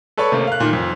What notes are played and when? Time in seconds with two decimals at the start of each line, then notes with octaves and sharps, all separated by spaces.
0.17 A4 B4 C#5 D5 C#6
0.32 C3 A3 A#3 C#4
0.47 F5 F#6
0.60 A#2 D#3
0.73 F2